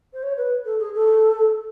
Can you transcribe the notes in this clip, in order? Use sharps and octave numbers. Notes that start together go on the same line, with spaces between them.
C5
C#5
B4
A4
G#4
A4